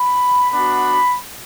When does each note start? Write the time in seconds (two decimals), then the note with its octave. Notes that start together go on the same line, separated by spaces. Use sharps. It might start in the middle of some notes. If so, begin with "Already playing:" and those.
Already playing: B5
0.51 B3 D4 F#4 B5